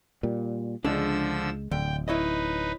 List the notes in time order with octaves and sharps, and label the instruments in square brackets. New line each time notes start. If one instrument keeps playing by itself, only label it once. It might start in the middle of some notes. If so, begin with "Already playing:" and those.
[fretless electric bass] A#2 G3
[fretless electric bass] C#2 G#3 [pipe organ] D3 F3 E6 [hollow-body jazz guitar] D4 G#4
[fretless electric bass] D1 [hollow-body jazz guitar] D3 [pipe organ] G5
[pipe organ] D#4 B4 [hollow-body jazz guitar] E4 C#5 D#5